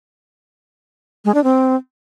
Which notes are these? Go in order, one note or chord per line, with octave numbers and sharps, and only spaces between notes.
G#3
D4
C4